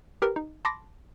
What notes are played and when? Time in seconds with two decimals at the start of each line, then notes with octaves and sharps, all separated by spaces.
0.22 G4 A#4 B4
0.36 D#4
0.65 A5 B5 C6 D6 A#6